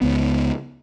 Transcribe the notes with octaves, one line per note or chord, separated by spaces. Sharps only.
C#2 B3